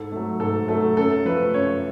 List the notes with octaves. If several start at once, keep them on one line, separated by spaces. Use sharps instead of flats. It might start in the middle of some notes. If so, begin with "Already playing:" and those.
Already playing: G#2 A4
F#3 A3
G#2 A4
F#3 A3 A4
F#2 A4
F3 A3 B4
F#2 C#5